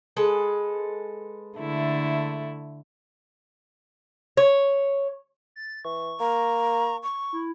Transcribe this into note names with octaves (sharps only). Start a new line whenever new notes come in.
G#3 A4 B4
D3 A3 E4
C#5
A6
E3 C#6
A#3 A#5
C#6
E4